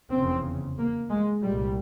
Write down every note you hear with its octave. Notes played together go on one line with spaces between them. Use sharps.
F1 E2 C#3 C4
A#3
G#3
C2 A#2 G3